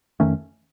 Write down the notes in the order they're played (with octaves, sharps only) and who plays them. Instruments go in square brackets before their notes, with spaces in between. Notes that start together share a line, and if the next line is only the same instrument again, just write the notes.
[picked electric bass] F2 D#3 A3 C#4